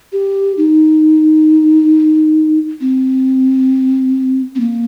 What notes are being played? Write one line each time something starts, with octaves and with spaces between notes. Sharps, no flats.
G4
D#4
C4
C4
A#3